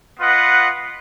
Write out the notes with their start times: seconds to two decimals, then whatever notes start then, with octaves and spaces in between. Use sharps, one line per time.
0.19 B3 F4 B4 D#5 F#5